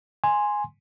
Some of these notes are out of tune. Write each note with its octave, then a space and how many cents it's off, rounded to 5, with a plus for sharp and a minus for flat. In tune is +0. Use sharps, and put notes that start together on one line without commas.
G#5 +0 C6 +0